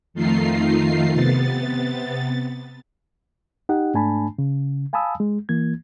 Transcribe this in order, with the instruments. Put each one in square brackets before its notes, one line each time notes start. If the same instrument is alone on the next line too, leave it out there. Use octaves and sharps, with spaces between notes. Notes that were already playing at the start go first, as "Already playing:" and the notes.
[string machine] F2 D#3 A3 D#4 F4 C7
C3 B3 A6
[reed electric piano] D#4 G4 D#5 F#5
G#2 A3 D4 G#5 A5 B5
C#3
F5 G#5 A5 B5 D#6 E6
G#3
E3 A#3 G#6